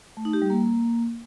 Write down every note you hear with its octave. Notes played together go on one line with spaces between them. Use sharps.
A3
D#4
G4
G3
A#3